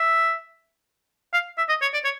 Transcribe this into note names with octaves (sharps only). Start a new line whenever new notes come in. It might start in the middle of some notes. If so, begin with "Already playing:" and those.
Already playing: E5
F5
E5
D#5
C#5
D5
C#5